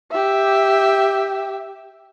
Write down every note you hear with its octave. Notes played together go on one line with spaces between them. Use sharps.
G4 E5